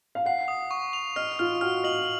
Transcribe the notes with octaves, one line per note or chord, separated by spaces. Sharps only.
F5
F#5 C7
D#6
C#6
F7
D#5 F6
F4 F6
F#4 F6
D#5 F#7